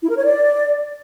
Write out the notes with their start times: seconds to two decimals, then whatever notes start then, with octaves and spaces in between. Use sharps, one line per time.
0.02 E4
0.09 A#4
0.17 C#5
0.24 D5